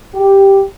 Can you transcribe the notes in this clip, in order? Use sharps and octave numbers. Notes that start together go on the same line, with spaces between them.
G4